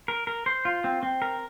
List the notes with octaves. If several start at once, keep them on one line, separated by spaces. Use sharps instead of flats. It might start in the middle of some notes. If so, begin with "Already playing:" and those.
A#4
A#4
C5
F4
C4
C4
A#4